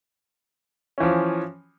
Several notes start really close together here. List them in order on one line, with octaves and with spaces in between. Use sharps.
C#4 E3 F3